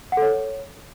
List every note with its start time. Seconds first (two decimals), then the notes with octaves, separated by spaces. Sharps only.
0.12 F#5
0.17 A4
0.22 C#5